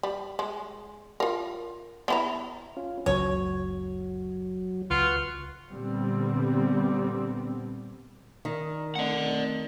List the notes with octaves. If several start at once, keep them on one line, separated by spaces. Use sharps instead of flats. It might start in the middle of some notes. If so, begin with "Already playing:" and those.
G3
G#3
F4 A#4
B3 E4 A#5
C#4 F4
F#1 C#2 F#3 C#5
C#2 F4 B4 F#5 C#6
A#2 D3 G3 B3 C4
D#3 D5 A#5
A3 C4 D5 D#5 F#5